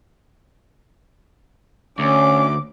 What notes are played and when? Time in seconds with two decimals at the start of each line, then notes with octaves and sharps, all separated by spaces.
1.99 D2 C#4 D6